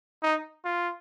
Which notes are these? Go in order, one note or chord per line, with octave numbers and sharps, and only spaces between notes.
D#4
F4